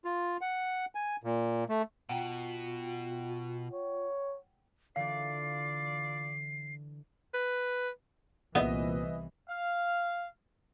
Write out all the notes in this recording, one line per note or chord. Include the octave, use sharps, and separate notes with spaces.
F4
F#5
G#5
A#2
A3
B2 F4 F#5 G5
C#5
D3 E3 D4 F4 D5 F5 C7
B4
C2 A#2 E3 B3 B4 D#5 E5
F5